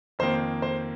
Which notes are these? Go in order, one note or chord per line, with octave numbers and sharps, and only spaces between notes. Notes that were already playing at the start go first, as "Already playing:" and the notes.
F2 D#3 A#3 C5
C5